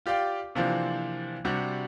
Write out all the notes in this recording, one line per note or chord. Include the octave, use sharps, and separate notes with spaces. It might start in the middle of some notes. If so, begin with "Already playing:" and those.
F4 G4 D5 F5 G5
C3 E3 F3 A#3 C4 D4
C3 G3 D4 F#4 G4